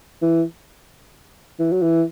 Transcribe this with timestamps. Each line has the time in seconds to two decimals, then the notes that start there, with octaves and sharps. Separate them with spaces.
0.22 E3
1.59 E3
1.72 F#3
1.82 E3